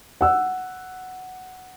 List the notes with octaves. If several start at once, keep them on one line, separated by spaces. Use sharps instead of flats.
F#5 E6